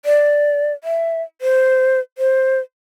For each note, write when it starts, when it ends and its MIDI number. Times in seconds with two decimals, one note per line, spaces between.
0.05 0.73 74
0.84 1.22 76
1.41 2.00 72
2.18 2.59 72